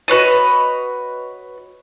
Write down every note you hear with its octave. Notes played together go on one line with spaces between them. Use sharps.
F#4 B4 C#5 D#5